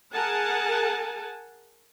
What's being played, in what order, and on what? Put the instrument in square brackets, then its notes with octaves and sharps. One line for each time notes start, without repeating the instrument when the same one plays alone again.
[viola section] G#4 A#4 F#5 G#5 A5